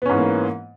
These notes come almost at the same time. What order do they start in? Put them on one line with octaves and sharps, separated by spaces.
B3 C#4 G#2 E3 A#3